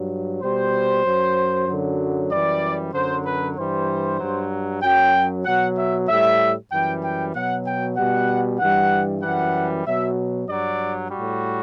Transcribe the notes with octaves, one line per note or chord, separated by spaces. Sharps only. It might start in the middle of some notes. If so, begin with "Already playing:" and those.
Already playing: G2 F#3
B2 G3 C5
F#2 F#3
F#2 D3 F#3
F#2 E3 G3 D5
F#2 D3 F#3 C5
B4
G2 E3 G3 C5
G2 F#3
F#2 F#3 G5
B2 F#3 F#5
E5
A2 G3 E5
F#2 E3 G3 G5
G5
B2 F#3 F#5
G5
B2 G3 F#5
G2 E3 G3 F#5
F#2 E3 G3 F#5
B2 F#3 E5
G2 F#3 D5
A2 G3 F#4